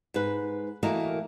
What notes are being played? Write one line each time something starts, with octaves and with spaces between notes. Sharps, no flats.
G#2 B4
E3 A3 A#3 F#4 A#4 D#5